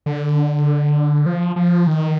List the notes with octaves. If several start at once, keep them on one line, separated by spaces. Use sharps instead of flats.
D3
F3
F3
D#3